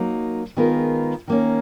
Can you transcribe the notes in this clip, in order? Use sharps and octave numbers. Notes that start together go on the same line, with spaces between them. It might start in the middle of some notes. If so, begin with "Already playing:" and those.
Already playing: F#3 A#3 D#4
D#3 G#3 B3 F4 A#4
D#3 A#3 C#4